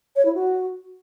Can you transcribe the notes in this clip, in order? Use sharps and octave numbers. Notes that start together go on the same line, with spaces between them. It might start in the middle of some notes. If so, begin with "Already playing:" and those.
C#5
E4
F#4